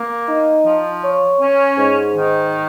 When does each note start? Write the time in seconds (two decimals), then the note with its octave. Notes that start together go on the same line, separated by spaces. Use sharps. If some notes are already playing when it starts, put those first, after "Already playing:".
Already playing: A#3
0.28 D#4
0.66 F3
1.03 C#5
1.41 C#4
1.78 G#2
2.16 D#3